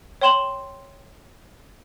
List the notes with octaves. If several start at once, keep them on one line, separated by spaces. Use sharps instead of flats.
C#5 G5 C6 E7 F#7 G7